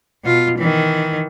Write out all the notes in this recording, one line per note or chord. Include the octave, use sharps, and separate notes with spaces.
B2 F4
D#3 E3